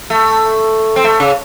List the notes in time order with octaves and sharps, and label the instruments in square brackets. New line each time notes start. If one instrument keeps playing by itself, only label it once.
[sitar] A3
C4
A3
C#3